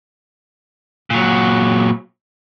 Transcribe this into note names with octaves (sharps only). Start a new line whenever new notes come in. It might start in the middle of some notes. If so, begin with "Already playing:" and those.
A#2 F#3